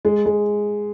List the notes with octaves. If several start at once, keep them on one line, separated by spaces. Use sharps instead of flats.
G#3
G#3